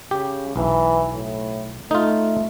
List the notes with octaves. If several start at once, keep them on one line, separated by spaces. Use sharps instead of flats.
C#3 G4
B1 E3
A2
A3 D#4 F4